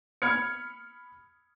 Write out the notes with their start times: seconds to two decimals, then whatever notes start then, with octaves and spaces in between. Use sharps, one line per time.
0.22 B5 F6 G#6 C#7